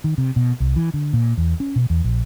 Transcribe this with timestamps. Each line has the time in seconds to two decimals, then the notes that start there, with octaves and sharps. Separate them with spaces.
0.04 D#3
0.18 C3
0.36 B2
0.60 C2
0.76 E3
0.94 D3
1.13 A#2
1.37 E2
1.60 C#4
1.76 B2
1.90 E2
2.04 A#1